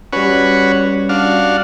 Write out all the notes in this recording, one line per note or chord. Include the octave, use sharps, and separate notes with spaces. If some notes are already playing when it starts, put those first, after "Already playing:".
G3 C#4 F#4 B4 C#5
D4 F#4 F5